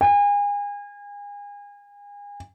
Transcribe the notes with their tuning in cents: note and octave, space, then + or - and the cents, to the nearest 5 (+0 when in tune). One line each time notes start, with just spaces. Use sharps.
G#5 -35